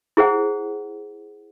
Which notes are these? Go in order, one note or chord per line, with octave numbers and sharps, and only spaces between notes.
E4 G#4 C5 F#5